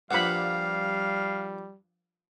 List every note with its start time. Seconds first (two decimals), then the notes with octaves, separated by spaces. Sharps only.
0.11 G2 A#2 F3 G3 F5 F#5 B5